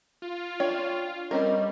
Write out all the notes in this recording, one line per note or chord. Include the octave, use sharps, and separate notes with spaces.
F4
D4 C#5 G5
G3 C4 C#4 A#4 D#5